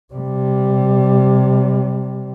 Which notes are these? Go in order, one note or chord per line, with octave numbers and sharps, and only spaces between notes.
C3 G3